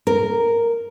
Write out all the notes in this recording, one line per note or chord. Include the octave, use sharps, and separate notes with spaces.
A#4